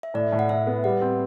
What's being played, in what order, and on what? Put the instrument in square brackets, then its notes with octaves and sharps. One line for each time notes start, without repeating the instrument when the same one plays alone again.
[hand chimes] E5
[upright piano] A2 [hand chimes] D5
[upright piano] A2
[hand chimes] F#5
[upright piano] A2 [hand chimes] E5
[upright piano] B3
[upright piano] G3 [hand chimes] F#5
[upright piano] C4